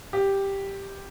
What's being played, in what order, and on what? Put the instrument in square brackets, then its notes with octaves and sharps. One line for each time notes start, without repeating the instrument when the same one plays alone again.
[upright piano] G4